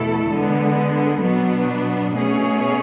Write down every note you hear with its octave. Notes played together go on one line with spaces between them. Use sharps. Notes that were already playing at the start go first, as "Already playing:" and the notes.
Already playing: E2 B2 A3 E4 A4
D3 G#3 B3
B2 F#3 B3 D4
B2 A3 C#4 G#4 C#5